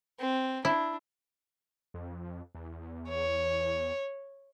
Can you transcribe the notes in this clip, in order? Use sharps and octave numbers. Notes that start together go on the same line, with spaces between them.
C4
D4 E4
F2
E2
C#5